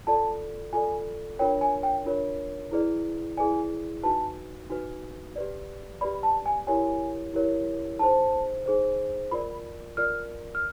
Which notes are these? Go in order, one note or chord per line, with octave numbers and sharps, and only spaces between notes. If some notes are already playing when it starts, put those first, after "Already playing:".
F4 A4 D5 A5
F4 A4 D5 G#5
D4 F4 A#4 C#5 G5
G#5
G5
D4 F4 A#4 C#5
E4 G#4 B4 D5
E4 G#4 B4 D5 G#5
D#4 F#4 B4 A5
D#4 F#4 B4
G4 B4 D5
G4 B4 D5 B5
A5
G#5
E4 G4 A#4 C#5 G#5
E4 G4 A#4 C#5
D#4 G#4 C5 A5
D#4 G#4 C5
F4 A#4 D5 B5
F4 A#4 D5 F6
F6